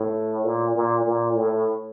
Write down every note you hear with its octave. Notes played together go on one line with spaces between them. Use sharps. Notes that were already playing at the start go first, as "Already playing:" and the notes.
Already playing: A2
A#2
A#2
A#2
A2